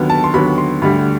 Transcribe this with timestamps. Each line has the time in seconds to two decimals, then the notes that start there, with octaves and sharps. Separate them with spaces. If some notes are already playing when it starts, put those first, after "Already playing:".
Already playing: D#2 D3 F#3 B3
0.10 A5
0.24 C6
0.34 D#2 D3 F#3 B3 B5
0.58 C6
0.82 D2 D3 G3 B5